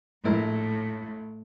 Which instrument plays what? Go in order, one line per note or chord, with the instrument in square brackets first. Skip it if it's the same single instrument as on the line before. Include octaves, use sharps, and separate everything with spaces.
[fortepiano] A#1 E4 A#4 [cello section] A2